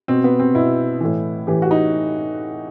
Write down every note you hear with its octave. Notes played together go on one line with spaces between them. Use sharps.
B2 C4
B3
C4
B2 E4
A2 E3
A2 E3 G4
F#4
D#4